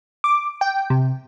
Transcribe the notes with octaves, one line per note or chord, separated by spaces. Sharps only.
D6
G5
C3